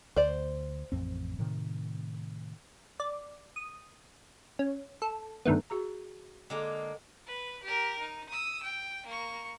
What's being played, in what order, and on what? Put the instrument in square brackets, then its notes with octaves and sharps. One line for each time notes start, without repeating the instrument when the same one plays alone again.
[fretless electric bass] D2 [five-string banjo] C5 D5
[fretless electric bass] A1 F2 C4
A2 C3 D#3
[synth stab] D5
D#6
C#4
A4
G2 D3 D#3 A3 B3
[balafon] F#4 G#4 A#5
[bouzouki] D3 G#3 A#3
[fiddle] B4
G4 A#4
D#4
D#6 E6
G5
A#3 C#6